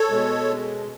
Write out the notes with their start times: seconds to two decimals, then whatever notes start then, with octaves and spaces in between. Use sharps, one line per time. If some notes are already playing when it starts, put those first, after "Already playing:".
Already playing: A4 C#5
0.10 B2 G#3